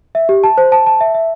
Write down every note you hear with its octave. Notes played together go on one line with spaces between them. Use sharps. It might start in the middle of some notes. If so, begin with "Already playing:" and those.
E5
G4
A5
C5
A5
A5
E5
E5